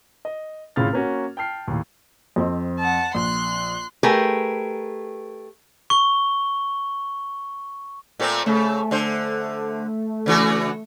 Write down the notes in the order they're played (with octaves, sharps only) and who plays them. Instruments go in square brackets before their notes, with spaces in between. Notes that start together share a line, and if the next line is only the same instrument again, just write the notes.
[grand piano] D#5
G#1 A2 C#3 F4 F6 A6
A#3 C#4 F#4
G5 A5 F6 C7
D#2 A2
[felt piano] F2 C4 D#5
[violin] F#5 A5
[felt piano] A#1 [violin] C6 F#6
[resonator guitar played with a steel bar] A3 G4 G#4 A#4 B4
[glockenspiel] C#6 G7
[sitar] A#2 A3 C4
[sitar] C#3 [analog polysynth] A3
[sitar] D3 C5
C#3 E3 F#4